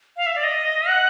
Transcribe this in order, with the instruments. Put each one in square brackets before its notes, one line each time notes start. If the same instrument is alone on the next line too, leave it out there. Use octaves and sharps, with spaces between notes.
[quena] F5
E5
D5
D#5
F#5